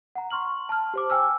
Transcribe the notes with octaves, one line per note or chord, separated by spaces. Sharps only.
F#5 A#5
C6 C#6 F6 F#7
A5 F6
G4 C5 D6
G5 G#5 E6 F6